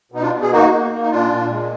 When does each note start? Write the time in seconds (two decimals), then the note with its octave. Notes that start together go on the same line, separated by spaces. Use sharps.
0.12 B2 D#4
0.22 D4 F4
0.32 B2
0.42 G#4
0.51 A#3 D#4 F#4
0.71 A#3
0.91 A#3
1.02 D#4
1.11 A#2 D4 F4
1.31 A#2
1.51 G#3